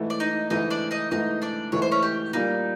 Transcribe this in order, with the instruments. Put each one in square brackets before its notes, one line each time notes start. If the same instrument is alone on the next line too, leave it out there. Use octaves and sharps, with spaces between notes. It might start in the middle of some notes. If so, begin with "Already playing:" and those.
Already playing: [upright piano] G#2 E3 A3
[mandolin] D5
D#4 D#5
[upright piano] G#2 E3 A3 [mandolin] D#4 D#5
[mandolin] D4 D5
D#4 D#5
[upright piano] G#2 E3 A3 [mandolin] D#4 D#5
[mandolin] D4 D5
[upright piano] G#2 E3 A3 [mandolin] C#5
[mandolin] C5
C#4 C#5
G4
[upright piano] A#2 G3 A#3 [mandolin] D#4